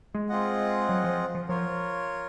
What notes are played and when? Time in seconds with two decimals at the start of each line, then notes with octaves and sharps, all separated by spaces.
0.14 G#3
0.29 C4 F4 G#4 D#5 F#5
0.89 F#3
1.04 F3
1.35 F3
1.49 F3 F4 A#4 C#5